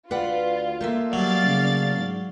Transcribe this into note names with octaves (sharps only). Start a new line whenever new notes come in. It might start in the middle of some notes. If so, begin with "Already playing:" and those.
D2 F4 B4 D5 F#5
A3 A#3 E5
F#3 G3 D5 F5 A6
C#3
G#2